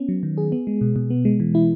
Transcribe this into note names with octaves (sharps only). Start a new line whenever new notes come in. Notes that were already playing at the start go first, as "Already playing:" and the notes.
Already playing: B3 C#4
F#3
D#3
G#4
B3
G#3
B2
B2
B3
G#3
E3
E4